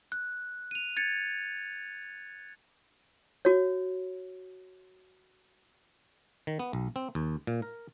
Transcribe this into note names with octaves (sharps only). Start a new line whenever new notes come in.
F#6
D#7 F7
G#6 A6 C#7
F#4 C#5
D#3
B3
B1
C4
D#2
A#2
A#4